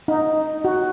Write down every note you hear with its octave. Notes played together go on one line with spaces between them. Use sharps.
D#4
F#4